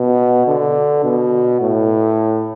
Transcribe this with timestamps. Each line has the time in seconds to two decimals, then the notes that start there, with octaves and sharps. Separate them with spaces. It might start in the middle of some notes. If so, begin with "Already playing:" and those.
Already playing: B2
0.47 D3
1.04 B2
1.61 A2